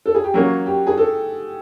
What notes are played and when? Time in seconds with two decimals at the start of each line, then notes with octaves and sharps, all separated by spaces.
0.06 A4
0.15 G#4
0.24 G4
0.34 F#3 A#3 C#4 F#4
0.66 G4
0.87 G#4
0.98 A4